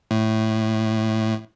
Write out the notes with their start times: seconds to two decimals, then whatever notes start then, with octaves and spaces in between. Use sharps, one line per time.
0.11 A2